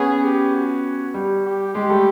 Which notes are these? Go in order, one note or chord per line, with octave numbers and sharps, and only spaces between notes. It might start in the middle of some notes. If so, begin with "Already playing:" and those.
Already playing: B3 C#4 G#4
G4
F#4
G3
G4
G#3 G4
G3 A3